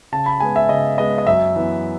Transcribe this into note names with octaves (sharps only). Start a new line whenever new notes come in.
C#3 A5
B5
G#3 B3 G#5
E5
C#3 D#5
G#3 B3 D#5
D#5
F#2 E5
E3 B3